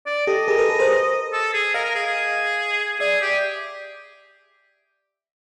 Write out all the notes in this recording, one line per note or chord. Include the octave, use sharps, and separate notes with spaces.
D5
G4 A4 D#5
G#4 A#4
A4 B4
A4 B4
A#4 C5
A4
G#4
A#4 D#5 F5
A#4
G#4
G#4
G#4 D5 E5
G4
E5